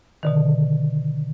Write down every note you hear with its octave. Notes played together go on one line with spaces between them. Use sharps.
B2 D3 D#3